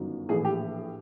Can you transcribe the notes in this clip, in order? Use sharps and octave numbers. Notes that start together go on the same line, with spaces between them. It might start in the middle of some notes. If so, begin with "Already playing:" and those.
Already playing: G1 F#2 D#3 F#3
A#1 A2 E3 G#4
G4